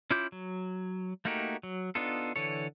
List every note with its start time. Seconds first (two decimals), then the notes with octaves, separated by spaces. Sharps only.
0.11 C#4 E4 F4 D6 G6
0.32 F#3
1.25 A3 A#3 D#4 F#4 G4
1.63 F#3
1.95 B3 D4 D#4 F4 A4
2.36 D3 E3 A4 C#5